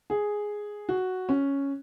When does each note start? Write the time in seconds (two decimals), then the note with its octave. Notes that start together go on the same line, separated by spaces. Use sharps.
0.10 G#4
0.89 F#4
1.29 C#4